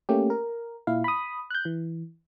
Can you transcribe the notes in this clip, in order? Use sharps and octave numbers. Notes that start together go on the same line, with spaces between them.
A3 A#3 C#4 G4
A#4
A#2 E4 F5
B5 D#6
F#6 G6
E3